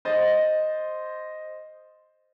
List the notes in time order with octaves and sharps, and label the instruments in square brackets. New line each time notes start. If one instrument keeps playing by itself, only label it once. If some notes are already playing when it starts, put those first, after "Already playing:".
[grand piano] C5 D#5 A6